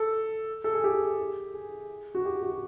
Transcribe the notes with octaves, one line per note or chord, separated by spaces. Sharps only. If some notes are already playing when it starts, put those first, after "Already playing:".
Already playing: A4
A4
G#4
G4
G#4
F#4
G4
F#4